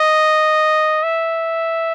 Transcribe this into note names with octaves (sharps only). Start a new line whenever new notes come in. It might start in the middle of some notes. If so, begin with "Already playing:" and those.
Already playing: D#5
E5